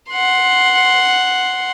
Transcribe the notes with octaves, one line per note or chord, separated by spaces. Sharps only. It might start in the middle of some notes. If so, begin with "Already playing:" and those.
F#5 C6